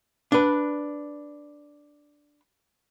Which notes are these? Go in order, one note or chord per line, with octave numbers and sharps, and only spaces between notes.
D4 B4